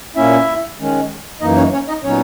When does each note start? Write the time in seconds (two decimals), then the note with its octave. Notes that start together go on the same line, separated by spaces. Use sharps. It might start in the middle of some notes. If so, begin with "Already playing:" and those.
0.16 A#2 A#3 C#4 E4 E5
0.79 D#3 G#3 C#4
1.41 F#2 E3 A#3 D#4 D#5
1.57 C#4 C#5
1.73 C#4 C#5
1.88 D#4 D#5
2.04 A#2 F#3 B3 C#4 D#4 C#5